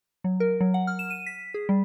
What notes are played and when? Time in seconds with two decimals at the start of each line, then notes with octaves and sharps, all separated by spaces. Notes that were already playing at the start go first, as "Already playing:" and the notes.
0.24 F#3
0.40 A#4
0.61 F#3
0.74 F#5
0.87 F6
0.99 E7
1.10 D#7
1.26 B6
1.54 G#4
1.69 G3